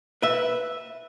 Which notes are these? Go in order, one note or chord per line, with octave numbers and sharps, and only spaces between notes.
B4 E5